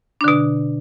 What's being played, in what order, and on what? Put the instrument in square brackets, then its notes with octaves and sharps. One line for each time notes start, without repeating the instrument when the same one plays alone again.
[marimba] D4
D3
B2